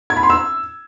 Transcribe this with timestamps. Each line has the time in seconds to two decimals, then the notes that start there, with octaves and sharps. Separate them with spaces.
0.10 G#6
0.17 B5
0.23 C6
0.30 E6